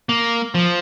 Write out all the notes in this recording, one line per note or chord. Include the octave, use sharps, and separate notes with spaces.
A#3
F3